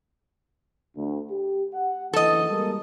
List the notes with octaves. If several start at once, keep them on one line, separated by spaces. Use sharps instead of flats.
D2
G4
F#5
F#1 D2 E3 A4 D#5
G3 G#3 A#3